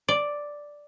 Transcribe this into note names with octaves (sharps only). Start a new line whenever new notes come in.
D5